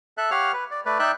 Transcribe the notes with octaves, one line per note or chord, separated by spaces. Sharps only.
A4 E5 F#6
G4 C#5 F5 F#5 F6
B4
D5
A3 B4 D5
D#4 D5 E5 G5 F#6